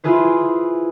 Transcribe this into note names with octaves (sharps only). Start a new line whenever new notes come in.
E4 F4 G#4 B4 C5